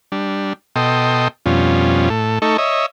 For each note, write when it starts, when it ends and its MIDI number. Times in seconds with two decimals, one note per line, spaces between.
0.12 0.53 55
0.12 0.53 62
0.76 1.28 47
0.76 1.28 69
0.76 1.28 75
0.76 1.28 79
0.76 1.28 84
1.46 2.09 41
1.46 2.09 47
1.46 2.09 55
1.46 2.09 61
1.46 2.09 65
2.10 2.39 45
2.10 2.39 69
2.42 2.57 57
2.42 2.57 63
2.42 2.57 69
2.42 2.57 85
2.58 2.86 73
2.58 2.86 75
2.58 2.86 76